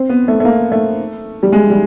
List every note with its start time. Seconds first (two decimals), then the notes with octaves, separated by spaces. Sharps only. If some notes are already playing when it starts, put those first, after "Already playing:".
Already playing: C4
0.09 B3
0.28 A3
0.40 A3
0.45 A#3
0.72 A3
1.43 G3
1.52 G#3
1.70 G3